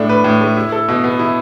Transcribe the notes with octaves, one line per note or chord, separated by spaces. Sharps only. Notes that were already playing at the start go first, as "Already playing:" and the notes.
Already playing: A2 A3 D4
B4
A2
A3
E4
A4
B2
B3
E4